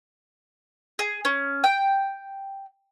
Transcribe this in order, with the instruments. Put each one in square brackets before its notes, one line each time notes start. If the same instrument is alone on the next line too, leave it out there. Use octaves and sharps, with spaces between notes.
[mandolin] G#4
C#4
G5